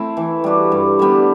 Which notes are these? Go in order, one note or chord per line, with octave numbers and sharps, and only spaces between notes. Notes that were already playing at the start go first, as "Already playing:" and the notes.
Already playing: A3 C4 E4
E3
G3 D4 F#4
G2
D3 G3 B3